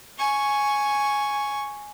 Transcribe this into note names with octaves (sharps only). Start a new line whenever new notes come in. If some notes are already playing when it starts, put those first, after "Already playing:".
G#5 C#6